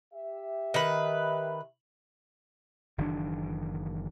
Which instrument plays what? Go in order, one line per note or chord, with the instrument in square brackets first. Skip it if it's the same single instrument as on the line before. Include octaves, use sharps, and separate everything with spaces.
[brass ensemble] G4 E5
[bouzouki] D#3 B4
[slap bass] F#1 D#3 E3 D4